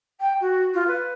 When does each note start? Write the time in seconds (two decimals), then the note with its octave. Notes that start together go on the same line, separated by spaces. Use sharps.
0.20 G5
0.40 F#4
0.73 F4
0.87 B4